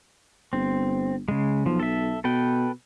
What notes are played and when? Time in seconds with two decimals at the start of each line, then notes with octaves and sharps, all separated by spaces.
0.53 G1 C4
1.28 C#3 G#3
1.66 B1 F3
1.80 A4 E5
2.24 B2 A4 B4 G5